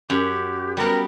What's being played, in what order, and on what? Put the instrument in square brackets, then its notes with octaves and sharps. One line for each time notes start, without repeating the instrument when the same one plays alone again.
[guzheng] F#2 [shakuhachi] G4
[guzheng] G3 B3 [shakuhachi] A#4